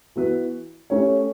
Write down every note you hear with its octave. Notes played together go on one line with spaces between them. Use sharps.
E3 B3 F#4 B4
A3 C#4 G4 C#5